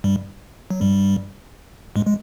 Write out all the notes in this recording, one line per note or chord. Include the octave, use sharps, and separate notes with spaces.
G2 G3
F#3
G2 G3
G#2 G#3
G#3